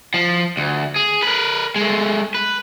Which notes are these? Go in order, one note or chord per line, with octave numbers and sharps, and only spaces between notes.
F3
D2
G#4
A#4 B4
G#3 A3
B4